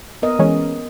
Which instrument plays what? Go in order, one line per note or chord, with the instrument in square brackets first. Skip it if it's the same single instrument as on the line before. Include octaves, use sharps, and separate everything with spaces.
[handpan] B3 A#4 D#5
[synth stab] E3 G#3 C#4